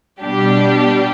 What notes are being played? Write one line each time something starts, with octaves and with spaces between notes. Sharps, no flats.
B2 G3 D4 G4